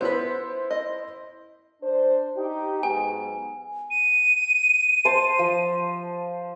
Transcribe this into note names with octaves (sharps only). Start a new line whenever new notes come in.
B3 E4 B4 C5
D#5
D4 C5
D#4 G4
G#2 F#3 B3 G#5
D#7
C5 A5
F3